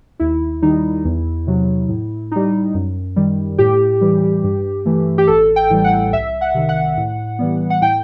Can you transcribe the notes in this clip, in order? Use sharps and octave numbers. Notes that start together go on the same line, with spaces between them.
D#2 E4
D#3 G3 D#4
E2
C3 F#3
A2
G3 D#4
F#2
D#3 G3
A2 G4
E3 G3
G2
E3 A3
G4
A1 A4
G5
A2 E3 G3
F#5
C2 E5
F#5
C3 D#3
F#5
A2
E3 G3 B3
F#5
A2 G5